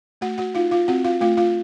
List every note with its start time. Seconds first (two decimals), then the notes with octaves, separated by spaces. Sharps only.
0.21 A3 F#4 F#5
0.38 F#4 F#5
0.54 D#4 F4 F5
0.71 F4 F5
0.88 C4 F#4 F#5
1.04 F4 F5
1.21 A3 F4 F5
1.37 F4 F5